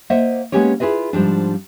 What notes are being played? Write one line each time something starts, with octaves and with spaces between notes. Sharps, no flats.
A#3 C5 D#5 E5 F#5
G#3 A#3 B3 C#4 G4 C#5
E4 F4 G#4 B4 D#5
G#2 F3 G3 D4